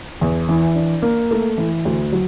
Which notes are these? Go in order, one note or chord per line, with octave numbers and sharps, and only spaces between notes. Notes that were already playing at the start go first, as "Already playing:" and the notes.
E2
E3
D4
A#3
A3
E3
D2
F#3